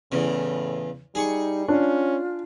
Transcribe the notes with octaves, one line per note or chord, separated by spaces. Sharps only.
E2 A2 C#3
G3 D#4 G#4 C#6
C#4 D4 F4